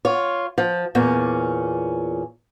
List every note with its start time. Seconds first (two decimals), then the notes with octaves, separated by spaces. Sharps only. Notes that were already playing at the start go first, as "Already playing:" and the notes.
0.05 F4 C#5
0.58 F3
0.95 E2 A#2 C#4